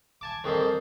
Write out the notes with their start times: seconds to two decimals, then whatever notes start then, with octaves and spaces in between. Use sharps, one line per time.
0.21 G#5 A5 D6
0.44 F2 D#3 G3 G#4 A4 C5